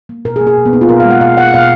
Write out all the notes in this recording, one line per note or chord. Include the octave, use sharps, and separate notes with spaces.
A#3
B2 A#4
G#4
A#3
G#4
B2
B3
A#3 D#4
F4
B2 A#4
F5
G#3
F#5
B2 F5
G#3 F#5
B2 F5